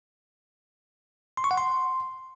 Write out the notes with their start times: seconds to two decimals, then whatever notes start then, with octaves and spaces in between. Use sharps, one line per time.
1.37 C6
1.44 C#6
1.51 F#5
1.57 C6